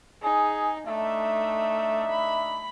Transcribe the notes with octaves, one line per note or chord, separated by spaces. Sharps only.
D#4 G#4
A3 D4 D#4 E5
B5